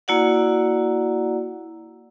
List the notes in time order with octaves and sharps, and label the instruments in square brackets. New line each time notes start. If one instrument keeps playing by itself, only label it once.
[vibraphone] A#3 E4 F#4 D5 F#5